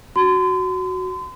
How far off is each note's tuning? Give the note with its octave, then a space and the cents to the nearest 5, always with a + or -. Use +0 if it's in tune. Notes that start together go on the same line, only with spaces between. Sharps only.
F#4 +0 C6 -40